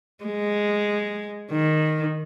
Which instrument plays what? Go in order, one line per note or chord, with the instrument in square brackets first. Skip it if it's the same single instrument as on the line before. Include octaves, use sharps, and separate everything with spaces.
[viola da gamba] G#3
D#3